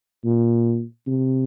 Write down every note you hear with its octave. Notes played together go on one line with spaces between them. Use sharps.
A#2
C3